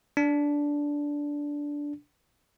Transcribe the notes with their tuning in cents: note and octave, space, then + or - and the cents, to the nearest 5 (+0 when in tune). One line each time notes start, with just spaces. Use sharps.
D4 -10